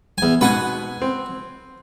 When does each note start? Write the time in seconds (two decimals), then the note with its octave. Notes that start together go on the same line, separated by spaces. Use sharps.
0.18 E2 G#5
0.41 G#2 B2 B4 F#5 G#5
1.02 C4